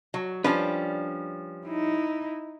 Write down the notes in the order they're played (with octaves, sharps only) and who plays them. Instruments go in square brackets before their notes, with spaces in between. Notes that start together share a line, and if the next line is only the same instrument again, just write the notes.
[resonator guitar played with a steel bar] F#3
[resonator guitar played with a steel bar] F3 G3 C#4 [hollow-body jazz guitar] D4 B4
[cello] D#4 E4